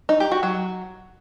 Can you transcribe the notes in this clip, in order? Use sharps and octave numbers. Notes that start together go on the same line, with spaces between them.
D#4
G4
F#4
F#3